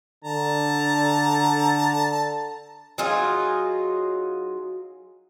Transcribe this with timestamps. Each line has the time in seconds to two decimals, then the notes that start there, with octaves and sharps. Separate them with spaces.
0.24 D3 A5 A#5
2.98 F#3 D#4 F4 G#4